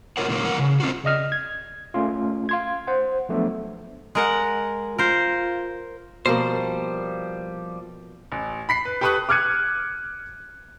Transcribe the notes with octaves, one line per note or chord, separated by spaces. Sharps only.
F4 F#4 A#4 C#5 F#5
A#2 D#3 F#3 A#3
G2 E3 A#3 A#4 F#5
C#3
C4 C#4 F4 F#4
C#3 D5 D#5 F6
G#6
A3 C#4 F4
F5 C6 G#6
C5 F#5
F3 F#3 A3 B3 D4
G#3 A#4 F#5
F4 A#4 C5
B2 F3 G3 A#3 C5
A1
B5 B6 C7
B4
G4 A4 B4 C#6 D#6 F#6
D6 F6 F#6 G#6 C#7 D#7